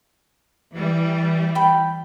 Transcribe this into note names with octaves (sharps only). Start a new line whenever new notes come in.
E3 G3
G5 B5